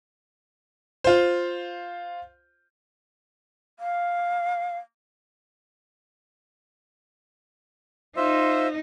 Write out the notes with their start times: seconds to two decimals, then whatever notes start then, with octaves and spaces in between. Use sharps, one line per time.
1.04 F4 C5
3.79 F5
8.17 D#4 F4 C5 E5